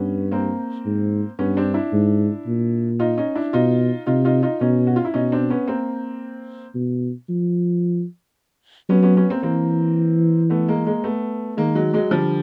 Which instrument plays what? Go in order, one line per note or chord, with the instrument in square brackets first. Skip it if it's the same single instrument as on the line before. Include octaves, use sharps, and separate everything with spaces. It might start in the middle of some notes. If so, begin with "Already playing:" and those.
Already playing: [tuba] G2 [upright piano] B3 C#4
[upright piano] A#3 C4
[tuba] G#2
[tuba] G2 [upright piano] B3 C#4
[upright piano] C4 D4
D4 E4
[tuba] G#2
A#2
[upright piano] D#4 F4
C#4 D#4
D4 E4
[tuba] B2 [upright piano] D#4 F4
[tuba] C3 [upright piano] D#4 F4
[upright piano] D#4 F4
D#4 F4
[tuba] B2 [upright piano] C#4 D#4
[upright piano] F#4
F4
E4
[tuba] B2 [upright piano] C#4 D#4
[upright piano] C4 D4
B3 C#4
A#3 C4
[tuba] B2
F3
[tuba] F#3 [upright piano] B3 C#4
[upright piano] B3 C#4
B3 C#4
A#3 C4
[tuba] E3 [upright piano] A#3 C4
[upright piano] A3 B3
G#3 A#3
G#3 A#3
A3 B3
[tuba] D#3 [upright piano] G#3 A#3
[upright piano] F#3 G#3
F#3 G#3
[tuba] D3 [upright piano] F3 G3